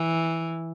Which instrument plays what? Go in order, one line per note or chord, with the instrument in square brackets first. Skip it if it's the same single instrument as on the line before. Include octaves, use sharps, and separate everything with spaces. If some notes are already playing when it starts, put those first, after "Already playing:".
Already playing: [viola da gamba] E3